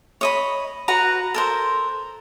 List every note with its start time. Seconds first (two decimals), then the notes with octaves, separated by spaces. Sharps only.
0.21 C#5 D#5 B5
0.88 F#4 B4 A#5
1.34 A4 A#4 C5